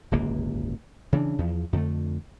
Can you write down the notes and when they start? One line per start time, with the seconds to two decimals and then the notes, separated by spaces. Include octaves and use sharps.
0.11 D1 G1 C#2 A#3
1.13 C#3 E3 B3 D4
1.38 E2 F3
1.73 F2 D3 A3